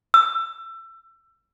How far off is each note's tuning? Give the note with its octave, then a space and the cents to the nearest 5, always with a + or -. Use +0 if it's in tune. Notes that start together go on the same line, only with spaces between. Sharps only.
E6 +25